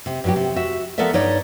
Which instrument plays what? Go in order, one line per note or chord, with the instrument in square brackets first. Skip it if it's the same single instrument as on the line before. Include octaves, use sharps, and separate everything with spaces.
[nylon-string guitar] C3
G2 F#3 G4
C3
F#4 E5
F3 B3 A4 A#4 D5 E5
G2 D#4 C#5 D5